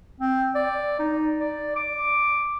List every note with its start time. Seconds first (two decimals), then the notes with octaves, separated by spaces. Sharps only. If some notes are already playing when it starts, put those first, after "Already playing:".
0.21 C4
0.55 D5
0.99 D#4
1.40 D5
1.76 D6